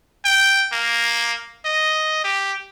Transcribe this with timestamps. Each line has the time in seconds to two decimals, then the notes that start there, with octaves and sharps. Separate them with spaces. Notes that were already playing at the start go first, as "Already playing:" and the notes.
0.25 G5
0.73 A#3
1.65 D#5
2.24 G4